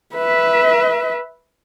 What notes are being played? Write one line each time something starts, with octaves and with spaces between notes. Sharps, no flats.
B4 E5